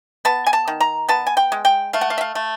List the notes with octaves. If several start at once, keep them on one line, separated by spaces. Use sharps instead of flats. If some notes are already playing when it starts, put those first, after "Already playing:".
B3 A5
G#5
A5
D#3
A#5
B3 A5
G#5
G5
G#3
G5
A3 F5
F#5
F5
E5
F5
A3